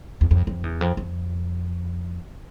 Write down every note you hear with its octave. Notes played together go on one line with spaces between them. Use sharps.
E2
F2
F2
E2
F2
F2